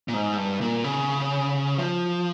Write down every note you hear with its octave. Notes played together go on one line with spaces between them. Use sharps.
A#2
G#2
G2
A#2
C#3
F3